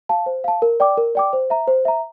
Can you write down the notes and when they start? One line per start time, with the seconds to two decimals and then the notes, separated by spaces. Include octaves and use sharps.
0.09 F5 A5
0.26 C5
0.44 F5 A5
0.62 A#4
0.80 D5 G5 D6
0.97 A#4
1.15 D5 G5 D6
1.33 C5
1.50 E5 A#5
1.68 C5
1.85 E5 A#5